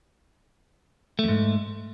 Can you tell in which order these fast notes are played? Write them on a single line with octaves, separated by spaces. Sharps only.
A3 F2 G#2